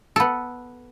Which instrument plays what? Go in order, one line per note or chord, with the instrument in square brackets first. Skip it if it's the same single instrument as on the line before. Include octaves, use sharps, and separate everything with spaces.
[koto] B3 A4